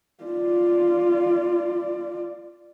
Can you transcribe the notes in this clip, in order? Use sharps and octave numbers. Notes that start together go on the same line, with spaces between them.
F4 D5